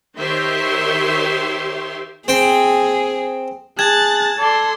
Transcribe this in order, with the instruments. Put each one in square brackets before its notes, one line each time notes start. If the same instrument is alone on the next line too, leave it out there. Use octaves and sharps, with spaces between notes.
[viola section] D#3 G4 C5 C#5 E5 C6
[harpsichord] C4 G5 [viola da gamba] G#4
[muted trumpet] G#4 [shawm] A5 [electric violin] F#6 A6 [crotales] G#6 E7
[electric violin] A4 C6 [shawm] D5 [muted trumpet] A5